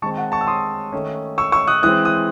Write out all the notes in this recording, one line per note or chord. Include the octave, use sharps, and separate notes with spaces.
D#3 G#3 C4 A5 C#6
F#5 A5
A5 C#6
E6
C6 D#6
D#3 A3 C#4
C#6 E6
C#6 E6
D#6 F#6
E3 G#3 C4 D#6 F#6
D#6 F#6